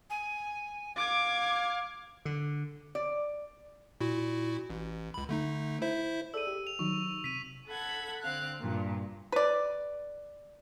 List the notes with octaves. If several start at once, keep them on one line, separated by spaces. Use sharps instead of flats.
G#5
F5 D6 G#6
D3
D5
A#2 E4 F#4
A1
C#2 B5
D3 A3 D#4
E4 C5 E5
G#4 A4 D5 E6 D#7
G4
F7
D#3 F#3 D#4 C#6
C3 B6 D#7
A4 F#5 B5 G#6
D3 C4 F5 F#6
G2 A#2
B4 D5